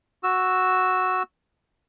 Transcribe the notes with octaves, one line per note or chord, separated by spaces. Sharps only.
F#4 E6